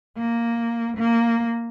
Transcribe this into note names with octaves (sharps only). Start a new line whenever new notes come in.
A#3
A#3